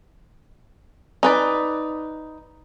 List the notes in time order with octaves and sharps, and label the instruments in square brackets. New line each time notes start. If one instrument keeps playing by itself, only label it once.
[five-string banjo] D#4 B4 D5